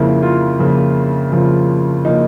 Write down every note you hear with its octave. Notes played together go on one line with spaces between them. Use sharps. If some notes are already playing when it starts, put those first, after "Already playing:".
Already playing: F2 C#3 F3 A#3 E4
F4
F2 C#3 F3 A#3
F2 C#3 F3 A#3
C#3 F3 A#3 D#4